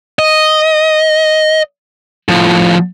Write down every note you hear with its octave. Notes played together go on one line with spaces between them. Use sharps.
D#5
A2 F3